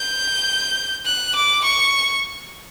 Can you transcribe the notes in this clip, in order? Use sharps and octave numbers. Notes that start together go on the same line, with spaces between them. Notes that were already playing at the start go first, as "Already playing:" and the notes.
Already playing: G6
F#6
D6
C#6